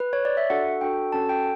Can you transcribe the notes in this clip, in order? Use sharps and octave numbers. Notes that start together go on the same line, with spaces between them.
B4
C#5
D5
E5
D4 F#4 A4 F#5
D4 F#4 A4 G5
C#4 F#4 A4 A5
G5